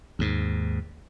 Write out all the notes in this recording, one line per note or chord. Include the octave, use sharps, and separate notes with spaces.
D#2 G#2